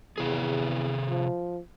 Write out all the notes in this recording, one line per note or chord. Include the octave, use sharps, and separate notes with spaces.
E2 C3 G#4
F3